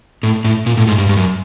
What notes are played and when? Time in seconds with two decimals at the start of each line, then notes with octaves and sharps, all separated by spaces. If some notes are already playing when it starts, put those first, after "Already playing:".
0.23 A2
0.44 A2
0.66 A#2
0.77 A2
0.87 G#2
0.98 G2
1.09 G2
1.17 F#2